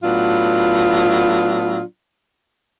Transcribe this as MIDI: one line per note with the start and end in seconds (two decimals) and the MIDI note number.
0.03 1.82 45
0.03 1.82 54
0.03 1.82 59
0.03 1.82 62
0.03 1.82 65